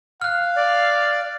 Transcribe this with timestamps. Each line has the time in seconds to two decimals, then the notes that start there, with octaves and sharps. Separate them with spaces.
0.21 F5 F6 F#6
0.57 D5